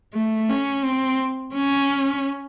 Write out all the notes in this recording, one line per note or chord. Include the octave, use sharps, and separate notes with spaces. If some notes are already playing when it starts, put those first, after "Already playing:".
A3
C#4
C4
C#4